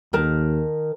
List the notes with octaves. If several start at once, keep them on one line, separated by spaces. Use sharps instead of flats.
D#2 D#3 A#4 A5